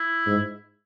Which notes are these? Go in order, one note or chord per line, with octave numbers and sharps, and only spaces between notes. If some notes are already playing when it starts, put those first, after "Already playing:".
Already playing: E4
G#2